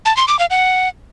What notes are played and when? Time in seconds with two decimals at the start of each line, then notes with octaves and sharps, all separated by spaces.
0.05 A5
0.17 C6
0.28 D6
0.39 F5
0.50 F#5